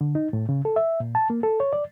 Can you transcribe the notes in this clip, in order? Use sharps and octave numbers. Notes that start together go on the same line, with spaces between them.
D3
D#4
A2
C#3
A4
E5
A#2
A5
A#3
A4
C#5
D5